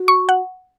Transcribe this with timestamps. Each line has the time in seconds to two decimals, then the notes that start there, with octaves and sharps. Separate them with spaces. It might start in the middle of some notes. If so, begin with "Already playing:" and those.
Already playing: F#4
0.08 C#6
0.29 F#5